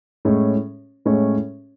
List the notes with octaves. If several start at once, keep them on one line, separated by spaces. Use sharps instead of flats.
A2 G#3 C#4
A2 G#3 C#4